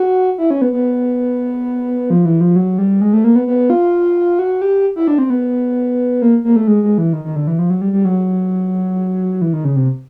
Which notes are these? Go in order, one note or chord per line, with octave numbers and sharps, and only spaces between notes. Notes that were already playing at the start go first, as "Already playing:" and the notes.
Already playing: F#4
E4
C#4
B3
B3
F3
E3
F3
F#3
G3
G#3
A3
A#3
B3
B3
F4
F#4
G4
E4
D4
C4
B3
A#3
A#3
A3
G#3
G#3
E3
D#3
D#3
D3
E3
F3
F#3
G3
G3
F#3
E3
D#3
C#3
C3